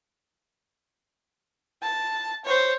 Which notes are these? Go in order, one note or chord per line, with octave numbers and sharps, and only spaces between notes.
A5
C5 C#5